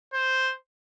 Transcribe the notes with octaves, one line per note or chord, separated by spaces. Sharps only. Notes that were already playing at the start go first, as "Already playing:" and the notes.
C5